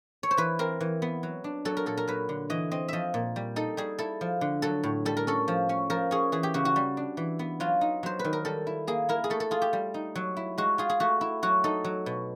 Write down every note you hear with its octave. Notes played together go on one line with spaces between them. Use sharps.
C#5
C5
E3 B4
C4 A#4
E3
B3
F#3
D4
F#3 A4
A#4
A#2 A4
A#4
F#3 B4
D3
E3 D#5
C4 D#5
F3 D#5 E5
A#2
G3
D#4 A4
G3 G#4
E4 A4
F3
D3
F#3 A4
A2
G3 A4
A#4
C#4 A4
F3
C#4
F3 A#4
C#4 G#4
E3 G#4
G4
C#3 F#4
F#4
G3
D4
E3
B3
F#3 F4
D#4
F#3 C5
B4
D#3
A#4
G3 A4
E4
A#3 G#4
E4 A#4
G#4
A3 A4
A4
F4 G#4
G4
G3
D#4
F#3
E4
G#3 F#4
F4 G#4
G#4
A3 F#4
E4
F#3 F#4
D#4 A4
F#3
B2